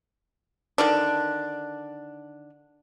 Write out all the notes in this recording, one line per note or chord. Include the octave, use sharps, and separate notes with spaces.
D3 D#3 D4